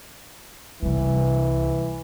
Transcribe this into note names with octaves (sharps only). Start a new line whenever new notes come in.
C2 E3 G3